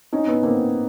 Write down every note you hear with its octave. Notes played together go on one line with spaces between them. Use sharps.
C#4 D#4
B3 C#4
A#3 C4